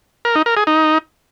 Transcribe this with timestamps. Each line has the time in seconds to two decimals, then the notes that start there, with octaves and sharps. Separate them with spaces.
0.25 A#4
0.36 D#4
0.46 A#4
0.57 G#4
0.67 D#4